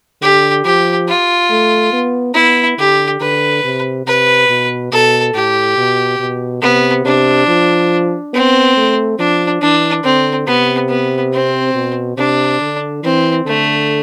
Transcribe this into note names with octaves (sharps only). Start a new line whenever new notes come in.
D3 G4
F3 G4
F4
A3
B3
B3 E4
D3 G4
D3 B4
C3
C3 B4
B2
B2 A4
A2 G4
B2
B2
C3 B3
C3 D4
F3
B3 C4
A3
F3 D4
E3 D4
D3 C4
C3 B3
B3
C4
B2
C3 D4
D3
E3 C4
D3 A3